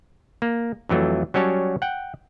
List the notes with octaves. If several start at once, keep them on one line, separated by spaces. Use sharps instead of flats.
A#3
F2 E3 F#3 A3
F#3 G3 C#4 C#5 A5
F#5 G5